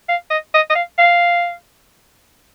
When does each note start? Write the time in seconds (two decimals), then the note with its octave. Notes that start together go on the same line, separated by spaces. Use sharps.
0.09 F5
0.31 D#5
0.54 D#5
0.70 D#5
0.75 F5
0.98 F5